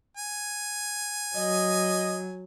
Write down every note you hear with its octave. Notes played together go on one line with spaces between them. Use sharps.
G#5
F#3 D#5